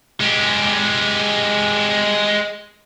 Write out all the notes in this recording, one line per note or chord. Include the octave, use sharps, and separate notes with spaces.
G#3 G4